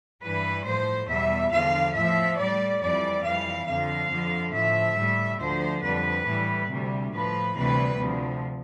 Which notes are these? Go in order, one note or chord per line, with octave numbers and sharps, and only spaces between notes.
G2 E3 G3 B4
A2 F3 C5
E2 B2 G3 E5
E2 D3 F3 F5
A2 F3 E5
A2 G3 D5
F2 E3 G3 D5
F2 E3 G3 F5
F2 D3 F3 F5
F2 D3 F3
A2 F3 E5
A2 G3
D2 D3 F3 C5
F2 D3 G3 B4
A2 E3 G3
D2 C3 G3
A2 F3 B4
D2 C3 E3 G3 B4
D2 C3 F3